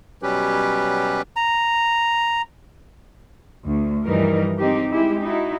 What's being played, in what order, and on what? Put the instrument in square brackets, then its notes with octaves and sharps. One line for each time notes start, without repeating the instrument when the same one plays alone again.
[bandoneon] B2 F#3 G3 C#4 G4 B4
[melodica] A#5
[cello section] D2
G2 E3 F3 G3 D#4 A#4
G#3 C4 D#4 G4
G#3 E4 G4
D#4 E4 F#4